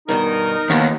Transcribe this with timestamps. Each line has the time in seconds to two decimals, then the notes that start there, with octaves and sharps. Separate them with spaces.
0.09 G2 B2 D#3 D#4 A#4
0.70 D#2 F3 B3